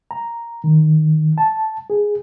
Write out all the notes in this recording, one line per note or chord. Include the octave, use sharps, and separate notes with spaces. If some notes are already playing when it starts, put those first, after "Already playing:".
A#5
D#3
A5
G#4